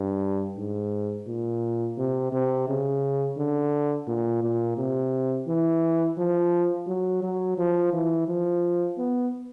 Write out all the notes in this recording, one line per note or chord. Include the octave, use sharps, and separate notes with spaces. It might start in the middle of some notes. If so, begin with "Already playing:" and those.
Already playing: G2
G#2
A#2
C3
C3
C#3
D3
A#2
A#2
C3
E3
F3
F#3
F#3
F3
E3
F3
B3